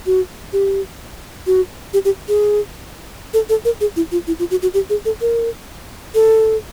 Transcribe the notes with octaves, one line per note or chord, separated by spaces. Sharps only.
F#4
G4
F#4
G4
G4
G#4
A4
A4
A#4
G#4
E4
F4
E4
F4
F#4
F#4
G4
G#4
A4
A#4
A4